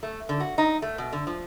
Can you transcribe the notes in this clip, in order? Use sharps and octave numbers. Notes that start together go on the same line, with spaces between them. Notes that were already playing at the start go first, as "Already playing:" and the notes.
A3
D3
F#4
D#4
A3
B2
D3
F3